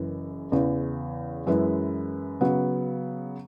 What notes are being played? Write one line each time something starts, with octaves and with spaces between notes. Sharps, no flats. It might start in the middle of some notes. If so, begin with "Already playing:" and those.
Already playing: F#1 F#2 E3
E2 C#3 E3
F#2 E3 G#3 E4 B4
C#3 F#3 B3